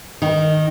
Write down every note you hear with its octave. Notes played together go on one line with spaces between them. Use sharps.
D#3